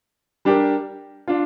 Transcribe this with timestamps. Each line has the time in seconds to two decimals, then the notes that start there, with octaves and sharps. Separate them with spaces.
0.45 G3 D4 G4 A#4
1.28 D4 F4